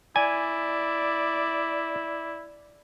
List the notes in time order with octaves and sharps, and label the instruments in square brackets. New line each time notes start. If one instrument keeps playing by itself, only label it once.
[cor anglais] E4 [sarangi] D5 [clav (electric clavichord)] G#5